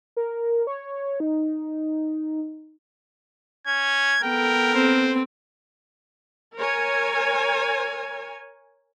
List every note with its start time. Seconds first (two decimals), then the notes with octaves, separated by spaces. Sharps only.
0.17 A#4
0.67 C#5
1.20 D#4
3.67 C#4 G#6
4.23 B3 A4 A#4 G5
4.75 C4 C5
6.59 A#4 C#5 G#5